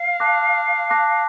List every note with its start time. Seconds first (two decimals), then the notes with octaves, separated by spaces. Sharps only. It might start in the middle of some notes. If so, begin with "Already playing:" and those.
Already playing: F5
0.20 A5 D6 F#6 A#6
0.90 A5 D6 F#6 A#6